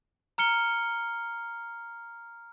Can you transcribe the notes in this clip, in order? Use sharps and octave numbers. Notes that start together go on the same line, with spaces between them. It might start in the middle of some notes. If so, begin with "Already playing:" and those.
A#5 F6 C#7 G7